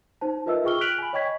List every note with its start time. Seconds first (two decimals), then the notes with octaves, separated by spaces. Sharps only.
0.21 D#4 C5 A5
0.46 F4 A#4 B4 D#5 E5 E6
0.64 F4 G#4 G5 C#6 F6 G7
0.81 F6 F#6 B6 D7 F7 F#7
0.98 G#5 B5
1.13 C#5 D#5 G5 C#6 G#6 B6